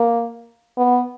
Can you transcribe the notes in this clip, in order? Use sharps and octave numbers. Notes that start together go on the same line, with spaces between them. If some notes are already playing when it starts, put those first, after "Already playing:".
Already playing: A#3
B3